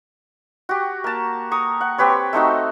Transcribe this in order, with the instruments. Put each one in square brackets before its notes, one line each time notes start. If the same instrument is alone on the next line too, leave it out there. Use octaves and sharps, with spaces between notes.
[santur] F#4 G4
A#3 A5
A#5 C#6 D#6
F#5
C4 G4 B4 C#5
A3 C4 D#4 F#4